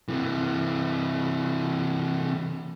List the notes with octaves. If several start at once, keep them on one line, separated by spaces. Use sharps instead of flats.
C3 E3